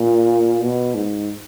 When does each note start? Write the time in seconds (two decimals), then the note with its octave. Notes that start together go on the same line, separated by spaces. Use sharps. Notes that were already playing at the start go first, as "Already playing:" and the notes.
Already playing: A#2
0.61 B2
0.95 G#2